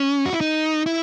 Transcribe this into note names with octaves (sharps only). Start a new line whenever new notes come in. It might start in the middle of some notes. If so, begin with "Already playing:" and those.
Already playing: C#4
F#4
E4
D#4
E4